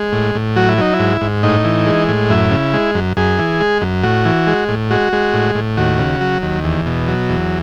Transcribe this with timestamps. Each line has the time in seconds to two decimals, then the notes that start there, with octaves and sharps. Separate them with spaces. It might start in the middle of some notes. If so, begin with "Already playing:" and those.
Already playing: G#3
0.12 A2
0.35 A2
0.56 F#3 F#4
0.68 E4
0.78 F#3 D#4
0.93 E4
0.99 G#2
1.21 G#2
1.43 A2 D#4
1.64 E3
1.86 G#3
2.09 A2
2.30 F#2 E4
2.51 C#3
2.73 G#3
2.95 F#2
3.17 F#2 G#4
3.39 E3
3.61 G#3
3.81 F#2
4.03 A2 F#4
4.25 E3
4.47 G#3
4.69 A2
4.90 G#3 F#4
5.13 G#3
5.34 A2
5.55 A2
5.77 D#2 F#4
5.99 C#3
6.21 F#3
6.42 D#2
6.64 E2
6.86 B2
7.08 F#3
7.29 E2